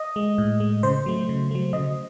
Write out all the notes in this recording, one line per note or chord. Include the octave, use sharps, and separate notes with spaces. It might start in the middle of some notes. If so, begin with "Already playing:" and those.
Already playing: D#5
G#3
A2
G#3
C#3 C5
F#3 A3
C#3
F#3 A3
C#3 D#5